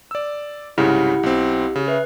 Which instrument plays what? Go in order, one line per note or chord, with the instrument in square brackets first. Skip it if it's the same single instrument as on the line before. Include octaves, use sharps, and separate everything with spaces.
[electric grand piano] D5 E6
[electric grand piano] C2 G#2 C#3 [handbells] E4 F#5 [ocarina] G4
[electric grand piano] B1 C4
C#3
[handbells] B4 [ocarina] E5